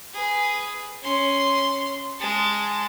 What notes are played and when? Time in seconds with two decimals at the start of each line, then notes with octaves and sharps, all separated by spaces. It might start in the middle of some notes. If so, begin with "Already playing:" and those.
0.14 G#4 B4
1.02 C#4 C6
2.19 G#3 A5